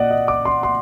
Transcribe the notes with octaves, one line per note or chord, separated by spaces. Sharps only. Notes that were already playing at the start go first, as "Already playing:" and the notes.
Already playing: A#2 D5 D#5 F#5
D#5
D6
C6
C6